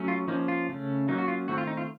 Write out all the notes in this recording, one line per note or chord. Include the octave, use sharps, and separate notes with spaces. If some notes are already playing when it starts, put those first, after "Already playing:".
Already playing: F#3 A3 C#4
F4
F3 A#3 C#4 D#4
F4
C#3 A3 C#4
F#3 A#3 C#4 D#4
F#4
F4
D#3 A3 C4 F#4
F4
D#4
F4